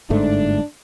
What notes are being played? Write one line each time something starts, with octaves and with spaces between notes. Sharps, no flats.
G1 G#2 A3 D4